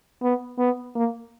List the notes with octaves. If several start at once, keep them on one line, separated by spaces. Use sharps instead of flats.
B3
B3
A#3